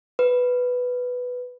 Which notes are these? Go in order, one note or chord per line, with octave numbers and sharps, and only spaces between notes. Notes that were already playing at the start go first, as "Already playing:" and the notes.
B4